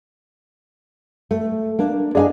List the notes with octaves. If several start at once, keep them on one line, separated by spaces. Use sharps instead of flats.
A3
A#3 D4
D4 G#4 D#5 F5 G#5